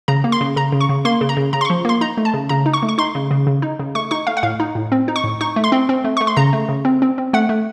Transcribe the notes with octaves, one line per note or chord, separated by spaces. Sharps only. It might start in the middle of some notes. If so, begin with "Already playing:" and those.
C#3 A#5
A#3
C6
C#3
C#3 A#5
C#3
C#6
C#3
A#3 C6
C#3
A#5
C#3
C#3 A#5
C6
C#6
F3
A#3 C6
D#4 A#5
A3
A5
C#3
C#3 A#5
D#4
C#6
A3
C#6
D#4 C6
C#3
C#3
C#3
D#4
C#3
A3 C#6
D#4 C#6
A3 F5
F#5
A2 F5
D#4
A2
C4
D#4
C#6
A2
D#4 C#6
A3
C6
C4
C4
A3
A3 C#6
C6
C#3 A#5
A3
C#3
C4
C4
C4
A3 F#5
A3